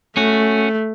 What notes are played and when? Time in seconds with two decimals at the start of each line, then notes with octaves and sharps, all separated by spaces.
0.17 A3 C#4 F#4